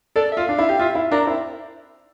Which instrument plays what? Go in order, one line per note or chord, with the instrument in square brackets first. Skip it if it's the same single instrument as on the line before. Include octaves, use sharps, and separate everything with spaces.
[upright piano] A4 [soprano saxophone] D5
[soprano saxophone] E5
[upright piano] F4
[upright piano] D4 [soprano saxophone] F5
[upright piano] E4
G4
[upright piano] F4 [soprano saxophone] E5
[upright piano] E4
[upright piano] D4 [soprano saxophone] A#4
[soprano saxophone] C4 [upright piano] E4